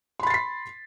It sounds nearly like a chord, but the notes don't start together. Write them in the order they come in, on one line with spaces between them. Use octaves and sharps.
C6 B5 A6 C7 B6